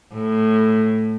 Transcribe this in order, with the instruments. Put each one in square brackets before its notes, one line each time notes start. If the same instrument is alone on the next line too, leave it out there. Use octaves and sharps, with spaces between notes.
[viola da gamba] A2